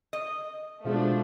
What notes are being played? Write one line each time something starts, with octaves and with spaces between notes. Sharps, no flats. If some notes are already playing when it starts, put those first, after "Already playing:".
D#5
B2 F3 G#3 A3 D4